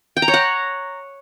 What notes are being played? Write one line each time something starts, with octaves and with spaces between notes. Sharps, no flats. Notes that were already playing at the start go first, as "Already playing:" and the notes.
G5
A#5
C#5
F#5